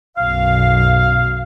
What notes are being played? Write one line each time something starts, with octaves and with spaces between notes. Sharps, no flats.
B1 F#2 B2 F5